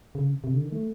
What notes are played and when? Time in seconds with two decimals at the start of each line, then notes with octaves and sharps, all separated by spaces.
0.15 C#3
0.44 C3
0.54 D3
0.63 D#3
0.72 A3